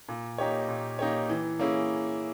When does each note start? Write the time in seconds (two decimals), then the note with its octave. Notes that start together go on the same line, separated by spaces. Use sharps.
0.09 A#2
0.38 A#3 D#4 G4 C#5
0.69 A#2
0.99 A#3 D#4 G4 C#5
1.29 E3
1.59 A#3 C#4 E4 G#4